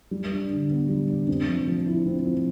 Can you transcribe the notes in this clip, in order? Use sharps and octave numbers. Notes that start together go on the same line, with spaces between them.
G3
D4
D3
B3
G3
D4
C4
F3
F3
E4
C4
F3